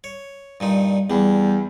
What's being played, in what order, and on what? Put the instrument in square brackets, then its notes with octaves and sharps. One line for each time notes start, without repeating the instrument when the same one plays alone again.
[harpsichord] C#5
G2 A#2 D#4
[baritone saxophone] E2 [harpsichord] G3